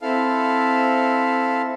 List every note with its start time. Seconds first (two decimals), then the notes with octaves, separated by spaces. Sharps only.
0.02 C4 E4 A4 F5